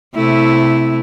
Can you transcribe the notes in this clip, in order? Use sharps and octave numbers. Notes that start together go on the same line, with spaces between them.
C3 A3 E4